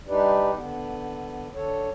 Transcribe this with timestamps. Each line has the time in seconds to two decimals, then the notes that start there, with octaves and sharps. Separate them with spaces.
0.08 G3 D4 D#4 G4 B4 D5
0.54 D3 B3
1.55 D3 A4 C#5